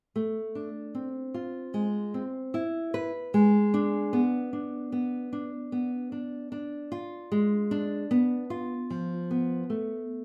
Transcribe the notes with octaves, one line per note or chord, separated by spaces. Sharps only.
A3
D4
C4
F4
G#3
C4
E4
B4
G#3
D4
B3
D4
B3
D4
B3
D4
D4
F4
G#3
D4
B3
F4
F3
B3
A3